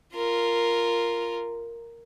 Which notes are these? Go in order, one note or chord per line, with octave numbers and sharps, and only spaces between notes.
F4 A#4